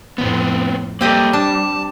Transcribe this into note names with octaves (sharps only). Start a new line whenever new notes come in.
F2 A2 B3 C4
G3 A#3 C4 G4 A4 D#5
D4 A5